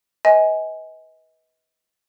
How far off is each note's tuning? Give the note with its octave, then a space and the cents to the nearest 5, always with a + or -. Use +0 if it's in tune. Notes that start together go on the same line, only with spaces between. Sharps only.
B4 +0 D#5 +35 G#5 +0